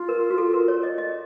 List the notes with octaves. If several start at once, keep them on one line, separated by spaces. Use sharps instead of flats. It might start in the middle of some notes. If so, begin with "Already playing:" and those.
Already playing: F4
A#4
F#4
A4
A#4
C#5
D#5
D#5